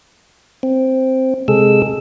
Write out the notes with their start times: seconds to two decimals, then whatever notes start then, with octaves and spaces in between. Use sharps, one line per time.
0.63 C4
1.48 C3 G#3 G#4 A4 E6